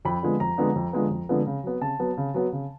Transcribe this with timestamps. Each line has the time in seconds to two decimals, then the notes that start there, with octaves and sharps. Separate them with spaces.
0.05 F2 B5
0.23 D3 F3 G#3 B3
0.40 F2 A#5
0.58 D3 F3 G#3 B3
0.75 F2
0.93 D3 F3 G#3 B3
1.11 F2
1.29 D3 F3 G#3 B3
1.47 C#3
1.63 F#3 B3
1.81 C#3 A5
1.99 F#3 B3
2.17 C#3
2.34 F#3 B3
2.53 C#3